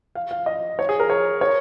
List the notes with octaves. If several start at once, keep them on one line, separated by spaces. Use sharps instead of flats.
F5
F5
D#5
C#5
G#4
A#4
C#5
C#5